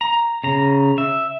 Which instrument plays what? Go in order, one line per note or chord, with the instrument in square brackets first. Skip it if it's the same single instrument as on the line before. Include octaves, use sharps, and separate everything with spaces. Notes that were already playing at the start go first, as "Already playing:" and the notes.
[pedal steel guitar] A#5
C#3 A#5
E5